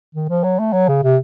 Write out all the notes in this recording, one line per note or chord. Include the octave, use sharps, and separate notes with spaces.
D#3
F3
F#3
A3
F#3
C#3
C3